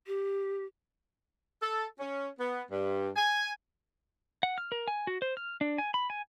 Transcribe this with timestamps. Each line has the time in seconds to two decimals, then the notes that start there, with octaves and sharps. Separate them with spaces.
0.07 G4
1.62 A4
1.99 C#4
2.39 B3
2.70 G2
3.16 G#5
4.43 F#5
4.58 F6
4.72 A#4
4.88 G#5
5.07 F#4
5.22 C5
5.37 F6
5.61 D4
5.78 G#5
5.94 B5
6.10 G#5